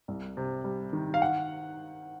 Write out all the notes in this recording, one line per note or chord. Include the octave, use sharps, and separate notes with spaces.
C2
C3
G3
D#3
F5
F#5